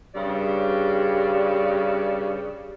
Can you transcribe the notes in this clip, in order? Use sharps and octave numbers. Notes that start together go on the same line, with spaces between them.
G2 C#3 G3 D5